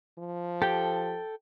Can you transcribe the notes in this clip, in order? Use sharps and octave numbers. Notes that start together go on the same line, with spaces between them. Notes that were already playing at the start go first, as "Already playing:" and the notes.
F3
G4 A4 G5